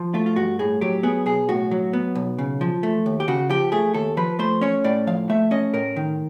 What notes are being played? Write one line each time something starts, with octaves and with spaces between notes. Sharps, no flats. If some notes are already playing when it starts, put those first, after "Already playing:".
Already playing: F3
A3 F4
F4
G2 F#4
A2 G#4
F#3 G4
B3 G#4
B1 G#4
A2 F#4
F#3
B3
B1
C#3
F3
A3
D#2
G4
C#3 F#4
F3 G4
A3 G#4
D#2 A4
F3 B4
A3 C5
C#4 C#5
A2 D5
F3 F5
A3 E5
C#4 D#5
A2 A#4
D#3